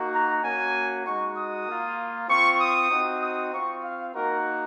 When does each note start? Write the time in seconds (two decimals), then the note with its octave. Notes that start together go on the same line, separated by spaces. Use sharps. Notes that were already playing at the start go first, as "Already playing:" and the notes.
Already playing: A#3 D#4 F#4
0.13 A#5
0.44 A#3 C#4 F#4 G#5
1.06 G#3 D#4 F#4 C#6
1.36 D#6
1.67 A#3 F4
2.29 C4 F4 C#6
2.60 D#6
2.91 C4 D#4 F#4
3.22 D#6
3.53 C4 F4 C#6
3.84 F5
4.15 A#3 D#4 F#4 A#4